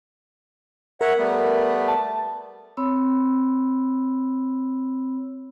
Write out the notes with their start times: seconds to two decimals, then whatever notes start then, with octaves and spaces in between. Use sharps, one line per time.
1.01 A#4 C#5 E5 F#5
1.17 G3 A3 B3
1.88 A5
2.77 C4 C#5 B5 E6